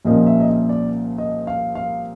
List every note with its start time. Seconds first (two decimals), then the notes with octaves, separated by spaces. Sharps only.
0.05 C2 A#2 F3 A#3 C#4 D#5
0.27 E5
0.40 D#5
0.48 E5
0.69 D5
1.18 D#5
1.47 F5
1.75 F5